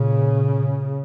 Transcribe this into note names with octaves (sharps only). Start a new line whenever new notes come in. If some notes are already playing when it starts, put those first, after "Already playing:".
Already playing: A#2 C#3